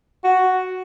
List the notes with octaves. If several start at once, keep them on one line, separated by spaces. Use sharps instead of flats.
F#4